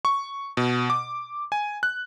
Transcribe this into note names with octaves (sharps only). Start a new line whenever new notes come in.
C#6
B2
D6
G#5
F#6